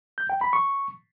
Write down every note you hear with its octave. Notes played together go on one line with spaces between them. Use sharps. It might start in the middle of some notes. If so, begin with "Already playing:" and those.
G6
G5
B5
C#6